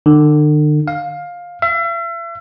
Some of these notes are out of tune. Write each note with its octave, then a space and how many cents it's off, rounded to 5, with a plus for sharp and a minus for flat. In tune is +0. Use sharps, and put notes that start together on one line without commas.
D3 +40
F5 +15
E5 +40